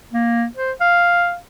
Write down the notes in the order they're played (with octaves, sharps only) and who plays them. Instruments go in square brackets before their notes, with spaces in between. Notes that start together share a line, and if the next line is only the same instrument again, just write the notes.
[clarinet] A#3
C5
F5